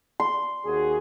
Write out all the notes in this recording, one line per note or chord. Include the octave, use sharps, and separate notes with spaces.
C6
D#2 F#4 G#4